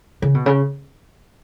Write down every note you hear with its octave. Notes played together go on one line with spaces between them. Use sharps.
C#3
B2
C#3